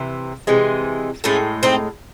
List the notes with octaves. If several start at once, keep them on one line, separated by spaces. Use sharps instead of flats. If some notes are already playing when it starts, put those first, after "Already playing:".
Already playing: C3 E3
C3 E3 G#3
A2 G#3 A3 C#4
C4 D#4